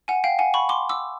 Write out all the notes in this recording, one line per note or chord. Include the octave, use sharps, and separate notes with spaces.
F#5 G#5
F5 G5
F#5 G#5
B5 C#6
C6 D6
D6 E6